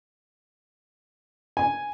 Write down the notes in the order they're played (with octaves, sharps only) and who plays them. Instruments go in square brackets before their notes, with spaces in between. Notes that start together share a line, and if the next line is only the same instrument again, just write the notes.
[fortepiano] G#5